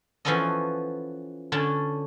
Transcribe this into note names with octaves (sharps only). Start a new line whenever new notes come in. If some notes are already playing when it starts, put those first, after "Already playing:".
E3 F3 B3 C#4 A4 D#5
D3 C#4 D4 C#5 A5